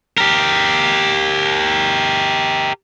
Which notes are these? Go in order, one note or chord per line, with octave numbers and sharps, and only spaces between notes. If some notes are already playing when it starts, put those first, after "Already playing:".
G4 A#4